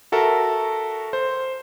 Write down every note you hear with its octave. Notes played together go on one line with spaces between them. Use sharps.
F#4 A4 A#4 E5
C5